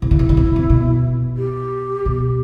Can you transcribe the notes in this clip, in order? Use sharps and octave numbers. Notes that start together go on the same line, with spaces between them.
C3 E4
C#3
C3
C#3
C3
C#3
C3
B2
G4
B2